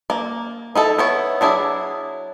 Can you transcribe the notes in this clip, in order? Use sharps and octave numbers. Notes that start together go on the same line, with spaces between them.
A#3
D#4 E4 A4
B3 E4 C#5
F#3 D4 E4 G#4